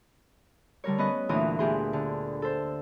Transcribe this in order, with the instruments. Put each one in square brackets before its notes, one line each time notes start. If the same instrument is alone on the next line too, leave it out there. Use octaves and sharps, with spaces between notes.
[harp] D3 G3 A#4 C#5
B3 C#4 B4 D#5
D2 A#2 E3 D#6
A#2 B3 G4 G#4 C6
D3
A4 C5